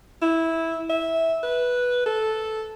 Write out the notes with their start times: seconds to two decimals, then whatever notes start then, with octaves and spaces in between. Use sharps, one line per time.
0.22 E4
0.90 E5
1.43 B4
2.06 A4